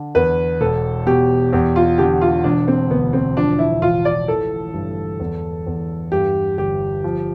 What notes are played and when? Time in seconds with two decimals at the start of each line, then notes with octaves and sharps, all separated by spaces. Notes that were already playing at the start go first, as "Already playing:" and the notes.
Already playing: D3
0.15 E2 B4
0.61 E1 A4
1.06 B2 G4
1.53 E2 G4
1.76 F4
1.98 D3 G4
2.21 F4
2.44 E1 D4
2.68 C4
2.90 D2 B3
3.13 C4
3.37 F3 D4
3.59 E4
3.82 A1 F4
4.05 D5
4.28 E3 A4
4.73 G2
5.20 E2
5.67 E2
6.12 G2 G4
6.58 G1 G4
7.04 F3